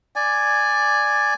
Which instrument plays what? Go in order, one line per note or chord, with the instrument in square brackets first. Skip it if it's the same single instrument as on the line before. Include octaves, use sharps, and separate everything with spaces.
[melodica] D5 G#5